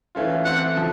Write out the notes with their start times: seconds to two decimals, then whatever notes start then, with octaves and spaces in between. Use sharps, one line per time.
0.15 E3 A3 C#4 F4
0.45 E3 A3 C4 F#5
0.76 C#3 F3